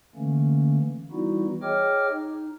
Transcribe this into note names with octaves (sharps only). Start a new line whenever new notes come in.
D3 E3 A3 A#3 C#4
E3 G3 B3 D#4 E4 F#4
G#4 C#5 D#5 G5 D6 F6
D#4